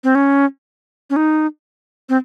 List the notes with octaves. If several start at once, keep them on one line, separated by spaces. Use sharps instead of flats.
C4
C#4
C#4
D#4
C4